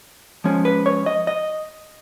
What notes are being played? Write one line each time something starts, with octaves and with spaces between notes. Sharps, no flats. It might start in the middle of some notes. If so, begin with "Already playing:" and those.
F3 G#3 C#4
B4
C#5
D#5
D#5